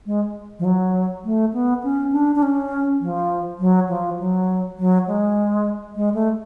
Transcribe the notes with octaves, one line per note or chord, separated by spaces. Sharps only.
G#3
F3
F#3
A3
B3
C#4
D4
D4
C#4
F3
F#3
F3
F#3
F#3
G#3
G#3
A3